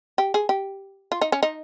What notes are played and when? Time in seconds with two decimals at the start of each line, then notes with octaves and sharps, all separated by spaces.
0.18 G4
0.34 G#4
0.49 G4
1.12 F4
1.21 D#4
1.32 C#4
1.43 D#4